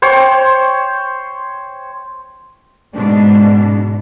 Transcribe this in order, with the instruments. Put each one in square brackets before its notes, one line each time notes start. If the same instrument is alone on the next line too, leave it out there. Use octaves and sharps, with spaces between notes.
[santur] C5 C#5 G5
[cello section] G#2 B2 D4